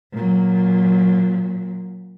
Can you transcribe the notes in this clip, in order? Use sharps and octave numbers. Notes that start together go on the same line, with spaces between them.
A#2 F#3